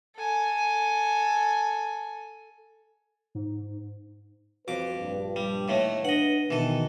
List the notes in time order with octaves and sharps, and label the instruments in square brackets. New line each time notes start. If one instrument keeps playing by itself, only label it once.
[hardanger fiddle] A4 G#5
[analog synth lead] G#2
[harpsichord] F2 D6 [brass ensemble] F#4 B4
[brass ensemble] A#1 G2
[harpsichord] G3
D#2 A2 A3
[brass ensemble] D4 B4 [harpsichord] D#5 F#5
[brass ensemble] B2 D#3 [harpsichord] E3 A4